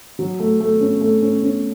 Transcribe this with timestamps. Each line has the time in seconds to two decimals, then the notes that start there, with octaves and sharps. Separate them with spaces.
0.19 F#3
0.40 A3
0.60 A3
0.81 C#4
1.01 A3
1.22 C#4
1.43 C#4